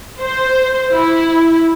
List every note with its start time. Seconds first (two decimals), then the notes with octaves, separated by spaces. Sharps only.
0.20 C5
0.92 E4